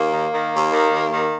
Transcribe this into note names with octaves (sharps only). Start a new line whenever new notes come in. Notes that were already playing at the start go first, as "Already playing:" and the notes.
Already playing: D#2 A#3
D#3
D#3
D#2
D#3
D#2
D#3